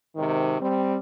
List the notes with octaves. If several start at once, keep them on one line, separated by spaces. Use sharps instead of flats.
G#2 C3 D#3
G3 C4